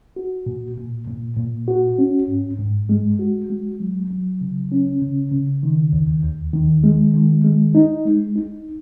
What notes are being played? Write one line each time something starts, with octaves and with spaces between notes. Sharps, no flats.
F#4
A#2
A#2
A#2
A#2
F#4
C#4
G#2
G#2
G#3
F#4
G#3
F#3
F#3
C#3
C#4
C#3
C#3
D#3
D#2
D#2
D#3
G#3
D#3
G#3
D#4
G#3
D#4